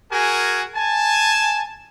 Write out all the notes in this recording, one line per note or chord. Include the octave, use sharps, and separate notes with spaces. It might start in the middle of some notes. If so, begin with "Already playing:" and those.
F#4 G#4 A#4 G#5
G#5 A5